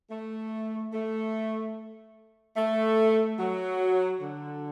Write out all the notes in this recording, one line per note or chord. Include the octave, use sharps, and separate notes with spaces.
A3
A3
A3
F#3
D3